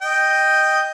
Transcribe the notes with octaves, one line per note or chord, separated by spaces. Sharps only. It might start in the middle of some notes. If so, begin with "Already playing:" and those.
D#5 G5